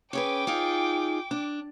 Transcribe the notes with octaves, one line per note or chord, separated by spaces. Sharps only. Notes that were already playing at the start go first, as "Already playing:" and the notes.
C#4 G#4 B4 G5 D6
D#4 F4 G#4
D4